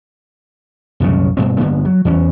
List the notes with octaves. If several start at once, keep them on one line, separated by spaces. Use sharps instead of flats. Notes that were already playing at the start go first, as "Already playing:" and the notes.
C2 F#2 A#2 C#3
G2 B2 C4
G2 D3 A#3 B3
F#3
E2 E3 C#4